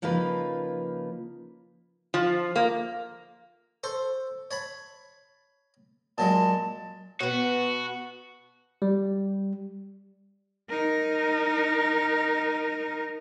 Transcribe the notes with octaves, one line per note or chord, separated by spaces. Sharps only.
C#3 F3 A#3 D#4 F4 B4
F3
A#3
A4 C5 C#6
C#5 A5 B5
A#2 F#3 G#3 A5
B2 B3 F#4
G3
D#4 A#4